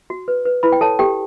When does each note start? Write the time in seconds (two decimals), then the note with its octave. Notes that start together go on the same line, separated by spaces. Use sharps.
0.10 F#4
0.28 B4
0.45 B4
0.63 E4 B4 B5
0.72 G5
0.81 A4 C#5 A5
0.99 G4 A4 G5